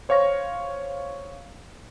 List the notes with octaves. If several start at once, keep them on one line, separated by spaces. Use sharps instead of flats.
C5 C#5 F5 C#6 A#6